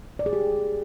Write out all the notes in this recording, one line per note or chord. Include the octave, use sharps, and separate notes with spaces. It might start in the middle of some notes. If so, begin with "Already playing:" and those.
D5
G#4
G4